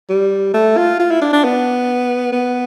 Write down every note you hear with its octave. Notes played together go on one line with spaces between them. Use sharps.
G3
A3
F4
F4
E4
D4
D4
B3
B3